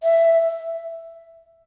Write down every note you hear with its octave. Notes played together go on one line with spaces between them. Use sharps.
E5